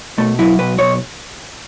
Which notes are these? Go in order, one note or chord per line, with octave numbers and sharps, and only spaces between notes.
B2 A3
F#3 E4
B1 B4
B1 C#5